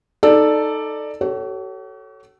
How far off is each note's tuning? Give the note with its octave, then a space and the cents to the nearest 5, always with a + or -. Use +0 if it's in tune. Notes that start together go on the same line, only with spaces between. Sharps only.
D#4 -5 A4 +0 D5 +10
F#4 +45 A4 +0 C#5 +0